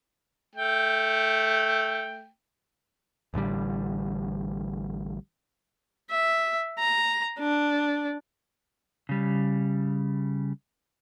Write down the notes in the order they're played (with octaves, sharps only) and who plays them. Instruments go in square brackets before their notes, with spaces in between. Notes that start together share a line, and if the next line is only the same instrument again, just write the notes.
[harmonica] A3 G5
[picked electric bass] A1 A2 D3 G3
[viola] E5
A#5
D4
[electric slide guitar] C#3 G3